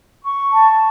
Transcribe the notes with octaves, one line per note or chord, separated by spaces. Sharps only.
C#6
A5